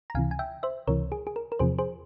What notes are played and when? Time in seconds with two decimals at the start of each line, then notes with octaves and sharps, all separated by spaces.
0.10 A#5
0.15 C#2 C3 E3 F5 G#5
0.31 G#5
0.39 E5 G5
0.63 C5 E5
0.87 C#2 C3 E3 A#4 C#5
1.12 G#4
1.27 G#4
1.36 A#4
1.52 A#4
1.59 E2 C3 F3 G#4 C5
1.78 G#4 C5